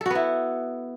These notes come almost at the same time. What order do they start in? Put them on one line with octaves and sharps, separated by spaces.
A4 F#4 B3 E4